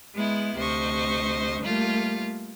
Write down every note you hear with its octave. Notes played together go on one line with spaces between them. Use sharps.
G#3 B3 E4
D2 C3 C5 D#5 C#6
G3 A3 A#3 F4